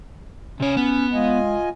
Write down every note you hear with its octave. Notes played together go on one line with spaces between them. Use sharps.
C3 C#4 C#5
B3
G#3 F4 D#5 G#5